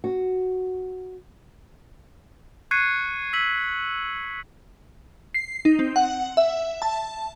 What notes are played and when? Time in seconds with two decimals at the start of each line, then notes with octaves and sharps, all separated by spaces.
0.04 F#4
2.71 C#6 F#6 G#6 C7 C#7 D#7
3.33 E6 B6 F#7
5.34 C7
5.65 D#4
5.79 C4
5.96 F#5
6.37 E5
6.82 A5